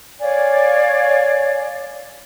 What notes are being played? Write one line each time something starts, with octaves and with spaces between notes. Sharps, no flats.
C#5 D5 F5 G#5